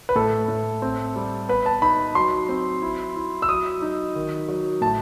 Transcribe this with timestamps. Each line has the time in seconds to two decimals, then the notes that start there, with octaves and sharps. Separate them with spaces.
0.09 B4
0.15 A2 A4
0.48 A2
0.82 C4
1.16 G3
1.49 B3 B4
1.66 A5
1.82 D#4 B5
2.15 F#3 C6
2.49 C4
2.82 E4
3.16 E4
3.42 E6
3.49 F#3 D#6
3.82 D#4
4.15 D#3
4.49 F#3
4.81 A2 A5